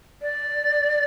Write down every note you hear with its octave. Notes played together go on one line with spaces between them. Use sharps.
D5